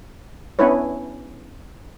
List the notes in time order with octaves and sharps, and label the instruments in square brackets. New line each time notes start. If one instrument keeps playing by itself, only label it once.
[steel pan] B3 C#4 D4 E4 B4 C#5